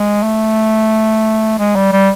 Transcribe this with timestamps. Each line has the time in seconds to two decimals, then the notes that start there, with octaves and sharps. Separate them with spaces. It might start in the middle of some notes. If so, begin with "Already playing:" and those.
Already playing: G#3
0.23 A3
1.59 G#3
1.76 G3
1.92 G3